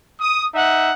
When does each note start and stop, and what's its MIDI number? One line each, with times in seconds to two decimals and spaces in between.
0.21 0.45 87
0.54 0.91 63
0.54 0.91 76
0.54 0.91 78